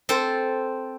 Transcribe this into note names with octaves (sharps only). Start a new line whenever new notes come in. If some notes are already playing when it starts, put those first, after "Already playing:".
C4 A4 C5